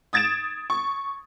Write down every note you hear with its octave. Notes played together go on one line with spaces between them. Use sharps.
D#6 G#6 A6 D7 E7
C#6